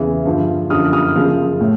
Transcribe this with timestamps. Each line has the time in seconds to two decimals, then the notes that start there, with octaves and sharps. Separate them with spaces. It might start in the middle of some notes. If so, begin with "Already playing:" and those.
Already playing: E2 C#3 E3
0.25 G2 D3 F3
0.70 F#2 D3 F3 D#6 F6
0.93 D#6 F6
1.16 F#2 C#3 F3
1.61 A2